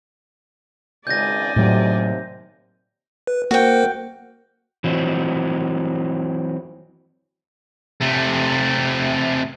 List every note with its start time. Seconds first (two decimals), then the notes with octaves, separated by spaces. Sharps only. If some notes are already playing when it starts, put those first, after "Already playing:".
1.07 G#1 C#2 D5 D#5 G#5 G6 A#6
1.56 D#2 A2 C3 F#3
3.27 B4
3.51 A#3 F#4 A#4 C5 G5
4.84 E3 F#3 C4
8.01 C3 A3